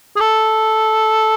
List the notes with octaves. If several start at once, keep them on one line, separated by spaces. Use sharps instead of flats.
G#4
A4